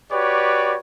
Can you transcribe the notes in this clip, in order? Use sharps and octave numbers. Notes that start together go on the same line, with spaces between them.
F#4 G4 B4 C#5 D5